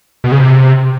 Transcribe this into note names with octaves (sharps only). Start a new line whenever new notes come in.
B2
C#3
C3